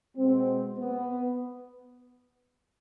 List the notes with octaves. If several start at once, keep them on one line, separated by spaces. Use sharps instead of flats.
B2 G#3 C4
B3